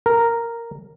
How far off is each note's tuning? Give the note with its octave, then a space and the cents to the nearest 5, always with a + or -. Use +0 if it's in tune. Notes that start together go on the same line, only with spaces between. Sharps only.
A#4 -5